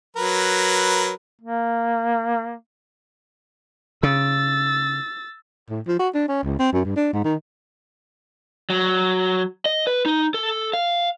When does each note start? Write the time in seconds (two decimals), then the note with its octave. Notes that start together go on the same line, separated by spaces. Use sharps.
0.16 F#3 A#4 B4
1.41 A#3
4.03 C#3 E6 A6
5.70 A2
5.87 F3
5.99 F#4
6.14 D4
6.28 C#4
6.44 C#2
6.59 C4
6.72 F#2
6.85 G2
6.96 D4
7.13 G#2
7.24 D#3
8.70 F#3
9.66 D#5
9.87 B4
10.06 D#4
10.34 A4
10.73 F5